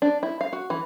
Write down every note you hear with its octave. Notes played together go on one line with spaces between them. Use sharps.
D4
E4
F5
F#4
E3